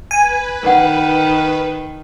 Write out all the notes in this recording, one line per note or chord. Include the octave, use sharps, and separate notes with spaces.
B4 G#5
D#3 A#4 F#5